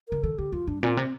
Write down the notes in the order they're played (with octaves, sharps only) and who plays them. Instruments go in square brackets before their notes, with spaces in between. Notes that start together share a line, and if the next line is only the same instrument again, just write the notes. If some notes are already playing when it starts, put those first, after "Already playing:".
[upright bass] D3 [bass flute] A#4
[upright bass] D#3 [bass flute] A4
[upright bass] D3 [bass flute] G4
[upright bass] F2 [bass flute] F4
[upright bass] G2 [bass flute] D4
[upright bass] A#2 [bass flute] C4
[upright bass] C3 [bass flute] C4